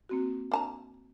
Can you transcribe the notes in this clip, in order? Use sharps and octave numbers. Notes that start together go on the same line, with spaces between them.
A#3 C4 F#4
D4 A5 A#5